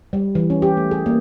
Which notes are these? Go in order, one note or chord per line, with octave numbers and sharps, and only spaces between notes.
G3
E3
C#4
G4
A3
G#4
A#3